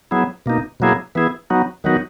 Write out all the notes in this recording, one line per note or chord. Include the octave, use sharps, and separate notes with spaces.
F#3 B3 E4 G#4
B2 A#3 D#4
B2 F#3 A#3 E4 G#4
E3 B3 E4 G#4
F#3 B3 D#4 F#4
D#3 F#3 B3 D#4 F#4